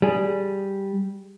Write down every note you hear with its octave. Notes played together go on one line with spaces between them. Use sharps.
G3 G#4